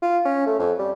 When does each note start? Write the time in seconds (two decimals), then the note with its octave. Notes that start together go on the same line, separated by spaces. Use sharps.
0.02 F4
0.25 C#4
0.46 A3
0.59 F2
0.79 G3